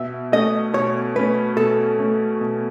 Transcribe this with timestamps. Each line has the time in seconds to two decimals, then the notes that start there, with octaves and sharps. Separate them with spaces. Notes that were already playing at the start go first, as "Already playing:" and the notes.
Already playing: B2 E5
0.32 A3 C#4 D#5
0.74 B2 C#5
1.16 A3 C#4 B4
1.57 B2 A4
1.99 A3 C#4
2.41 B2